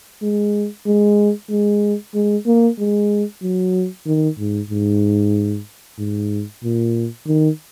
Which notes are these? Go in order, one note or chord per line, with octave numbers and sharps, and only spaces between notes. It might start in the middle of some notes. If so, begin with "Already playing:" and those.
G#3
G#3
G#3
G#3
A#3
G#3
F#3
D#3
G#2
G#2
G#2
A#2
D#3